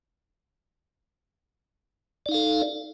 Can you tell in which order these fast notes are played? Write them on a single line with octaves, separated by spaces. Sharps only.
D5 D#4 F5 A4